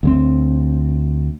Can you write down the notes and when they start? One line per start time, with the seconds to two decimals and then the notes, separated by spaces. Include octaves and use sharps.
0.03 D2 G#3 C4